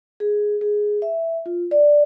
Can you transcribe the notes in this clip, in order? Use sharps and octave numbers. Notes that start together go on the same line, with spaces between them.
G#4
G#4
E5
F4
D5